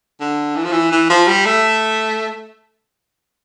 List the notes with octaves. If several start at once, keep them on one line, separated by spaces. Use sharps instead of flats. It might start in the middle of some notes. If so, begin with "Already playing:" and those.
D3
E3
F3
E3
E3
F3
G3
A3